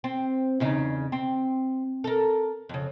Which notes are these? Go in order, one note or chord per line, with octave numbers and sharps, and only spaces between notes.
C4
E2 C#3 D#4
C4
A4 A#4
F2 C#3